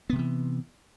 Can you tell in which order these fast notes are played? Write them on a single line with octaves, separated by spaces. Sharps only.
B3 C3 F3 E3